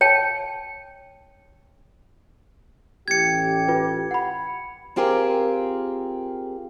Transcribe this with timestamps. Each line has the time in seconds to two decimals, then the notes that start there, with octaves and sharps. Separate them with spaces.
0.01 C#5 G5 A5
3.08 A1 G4 G#6 C#7
3.68 F4 B4
4.11 F#5 B5
4.96 C4 F4 G4 G#4 A#4